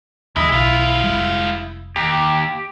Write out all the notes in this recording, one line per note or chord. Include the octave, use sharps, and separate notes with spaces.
D#2 C#3 F#3 E4 G#4 D#5
B1 G#3 F5
F1 G3
D#2 G4